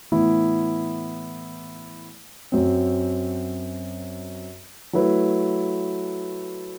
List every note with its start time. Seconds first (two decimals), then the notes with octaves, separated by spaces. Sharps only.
0.12 A2 E3 B3 E4
2.52 F#2 F#3 C4
4.93 F#3 A3 E4 B4